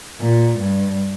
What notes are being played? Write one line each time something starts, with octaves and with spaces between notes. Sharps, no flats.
A#2
G2